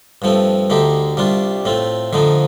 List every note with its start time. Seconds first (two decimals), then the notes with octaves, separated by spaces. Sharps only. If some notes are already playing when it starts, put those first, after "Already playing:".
0.22 G2 F3 A3 C4
0.70 D2 D3 A3 D#4 G4
1.17 C2 C3 G3 D4 F4
1.65 A2 A3 C4 F4
2.13 F2 D3 F3 A3 D#4